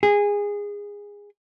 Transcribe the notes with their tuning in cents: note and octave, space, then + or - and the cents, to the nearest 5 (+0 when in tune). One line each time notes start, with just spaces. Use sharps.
G#4 -20